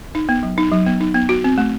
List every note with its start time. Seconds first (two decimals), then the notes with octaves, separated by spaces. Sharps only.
0.15 D#4
0.29 B3
0.43 F#3
0.58 D#4
0.71 F#3
0.86 B3
1.01 D#4
1.14 B3
1.29 F#4
1.44 C4
1.58 A3